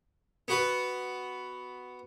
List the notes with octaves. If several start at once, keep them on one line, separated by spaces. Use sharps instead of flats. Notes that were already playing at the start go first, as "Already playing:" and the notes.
B3 F#4 B4